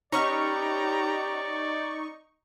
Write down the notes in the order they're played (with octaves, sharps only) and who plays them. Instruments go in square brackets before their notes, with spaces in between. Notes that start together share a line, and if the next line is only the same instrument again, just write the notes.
[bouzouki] C#4 B4 C#5 [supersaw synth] D#4 C#6 [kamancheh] G4 A#5 [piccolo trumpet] D5